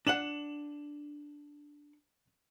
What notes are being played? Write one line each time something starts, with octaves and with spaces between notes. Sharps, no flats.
D4 F#5 E7 F#7